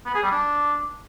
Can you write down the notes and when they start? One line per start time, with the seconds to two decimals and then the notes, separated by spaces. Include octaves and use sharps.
0.06 B3
0.15 G#4
0.23 G3
0.31 D4